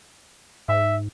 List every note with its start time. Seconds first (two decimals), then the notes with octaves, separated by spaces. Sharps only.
0.69 G#2 E5